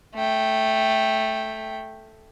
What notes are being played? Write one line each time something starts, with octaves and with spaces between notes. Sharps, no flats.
A3 G5